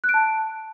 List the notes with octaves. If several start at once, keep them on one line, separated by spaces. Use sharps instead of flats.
F#6
D7
A5